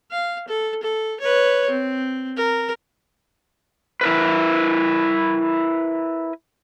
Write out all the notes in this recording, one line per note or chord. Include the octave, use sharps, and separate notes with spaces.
F5
A4
A4
B4 C#5
C4
A#4
E4 A#4 B4